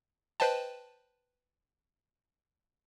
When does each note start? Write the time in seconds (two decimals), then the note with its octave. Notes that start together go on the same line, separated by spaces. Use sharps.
0.40 B4 C5 D#5 G5 A5